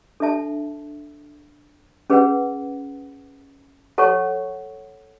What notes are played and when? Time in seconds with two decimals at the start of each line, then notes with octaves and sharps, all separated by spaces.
0.20 D4 A4 E5 A5
2.10 C#4 G#4 B4 F#5
3.98 A4 C#5 F#5 A5 C#6